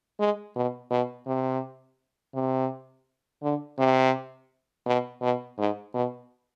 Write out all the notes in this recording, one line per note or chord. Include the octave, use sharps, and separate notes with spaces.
G#3
B2
B2
C3
C3
D3
C3
B2
B2
G#2
B2